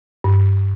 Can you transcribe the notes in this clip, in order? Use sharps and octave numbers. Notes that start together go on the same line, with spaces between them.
G2